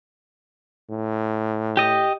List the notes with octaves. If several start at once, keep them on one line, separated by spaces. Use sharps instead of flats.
A2
G4 D#5 D#6